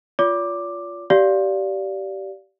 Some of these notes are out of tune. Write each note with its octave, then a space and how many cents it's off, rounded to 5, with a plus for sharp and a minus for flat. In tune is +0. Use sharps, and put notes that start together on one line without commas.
F4 +0 D5 -45 D6 +5
G4 -20 D5 -15 F5 +0